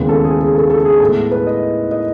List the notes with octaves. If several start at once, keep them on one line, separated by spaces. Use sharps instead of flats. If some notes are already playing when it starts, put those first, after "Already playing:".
Already playing: D#2 C#3 E3 G#3 B3
A4
G#4
G#4
A4
A4
G#4
A2 G#3 B3 A4
B4
D#5
D#5